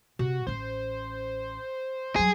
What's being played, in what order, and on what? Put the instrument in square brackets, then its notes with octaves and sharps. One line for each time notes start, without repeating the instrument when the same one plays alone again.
[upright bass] C3 [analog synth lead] F#4
[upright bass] A1 C#4 [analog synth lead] C5
[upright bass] F#3 G3 [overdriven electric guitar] G#4